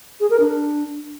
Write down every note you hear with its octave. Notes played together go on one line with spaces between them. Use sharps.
G#4
A#4
D4